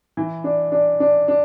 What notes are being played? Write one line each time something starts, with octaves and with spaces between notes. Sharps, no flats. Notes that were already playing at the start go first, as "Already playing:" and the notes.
E3
D4
D4
D4
D4